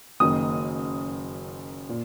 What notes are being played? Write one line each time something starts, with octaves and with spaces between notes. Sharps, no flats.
F#1 F#2 D#3 D#6
A#2